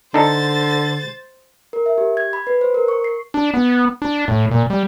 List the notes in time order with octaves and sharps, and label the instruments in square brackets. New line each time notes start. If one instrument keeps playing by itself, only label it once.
[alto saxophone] D3 [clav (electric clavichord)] D4 D#4 A4 [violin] C5 A6
[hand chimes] A#4
E5
G4
G#6
B5
B4
C5
A#4
C#6
C7
[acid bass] D4
B3
D4
A2
A#2
G3